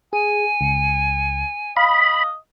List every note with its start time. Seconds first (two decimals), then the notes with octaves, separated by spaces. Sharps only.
0.13 G#4 G#5
0.61 C#2 C#7
1.77 D#5 F5 B5